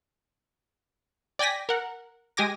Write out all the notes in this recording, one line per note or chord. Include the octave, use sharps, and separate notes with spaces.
D5 G5 G#5 A#6 B6
A#4 F#5
G#3 G4 G#5 D6 A#6